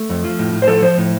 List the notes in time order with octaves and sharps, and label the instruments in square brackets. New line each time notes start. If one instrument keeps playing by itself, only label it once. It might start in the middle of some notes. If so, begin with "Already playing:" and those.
Already playing: [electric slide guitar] A3
F2
F3
A2
A2
C5
F3 A4
F3 C5
A2